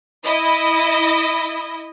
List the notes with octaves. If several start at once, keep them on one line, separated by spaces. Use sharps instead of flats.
E4 D#5